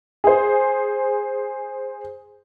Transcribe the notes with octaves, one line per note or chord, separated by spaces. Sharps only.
G#4 C5